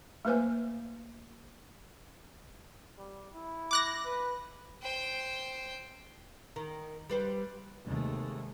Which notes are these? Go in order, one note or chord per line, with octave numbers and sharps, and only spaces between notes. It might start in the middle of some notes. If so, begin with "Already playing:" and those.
A3 A#3 B4 C5 G#5
G3
E4
D6 F#6 A#6
B4
C5 G5
D#3
G3 B4 C5
D#2 C3 D#3 G#3 A3